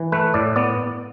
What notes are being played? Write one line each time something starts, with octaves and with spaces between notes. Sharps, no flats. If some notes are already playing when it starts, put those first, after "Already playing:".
Already playing: E3
A3 B4
A2 D5
B3 D5